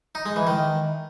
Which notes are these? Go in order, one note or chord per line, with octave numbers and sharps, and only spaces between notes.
D#4
G#3
E3
D#3